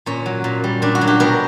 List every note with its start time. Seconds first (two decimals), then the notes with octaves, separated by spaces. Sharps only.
0.06 A#2 C#4
0.26 F#3
0.44 A#2
0.64 G3
0.82 A#2 D4
0.95 F#4
1.01 F#3
1.07 G4
1.20 B2 A#4